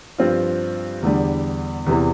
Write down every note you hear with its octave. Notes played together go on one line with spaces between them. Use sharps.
G2 F3 C4 F4
E2 D3 G3
E2 C3 E3